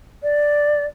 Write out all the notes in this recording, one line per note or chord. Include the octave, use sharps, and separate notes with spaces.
D5